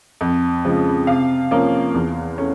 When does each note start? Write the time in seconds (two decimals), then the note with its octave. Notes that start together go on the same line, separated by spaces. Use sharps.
0.21 F2
0.65 C#3 F3 G#3
1.07 C3 F5
1.51 F3 A#3 C#4
1.94 E2
2.38 A3 C#4